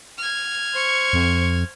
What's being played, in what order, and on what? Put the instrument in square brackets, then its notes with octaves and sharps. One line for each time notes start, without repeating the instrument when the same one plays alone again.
[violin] F6 G#6
[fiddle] C5 C#6
[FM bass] F2